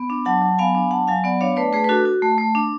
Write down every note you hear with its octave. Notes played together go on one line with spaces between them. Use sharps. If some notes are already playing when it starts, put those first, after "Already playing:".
Already playing: B3
D4
F#3 F#5 A5
F#3
B3 F5 G#5
D4
F#3 F#5 A5
F#3 F5 G#5
B3 D5 F#5
D4 C#5 F5
A3 B4 D5
A3 G#4 B4
B4
D4 F#4 A4
F#4
A3
A3
D4